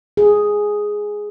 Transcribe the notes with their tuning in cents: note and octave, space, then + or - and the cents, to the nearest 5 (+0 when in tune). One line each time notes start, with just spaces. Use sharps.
G#4 +0